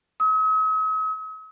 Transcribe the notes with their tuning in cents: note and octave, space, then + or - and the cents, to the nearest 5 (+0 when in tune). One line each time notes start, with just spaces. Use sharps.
D#6 +45